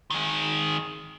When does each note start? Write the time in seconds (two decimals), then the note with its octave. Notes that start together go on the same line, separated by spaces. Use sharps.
0.10 D#3 G#3